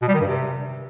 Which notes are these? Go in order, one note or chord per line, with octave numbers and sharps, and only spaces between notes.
B2
G3
D#3
G2
C3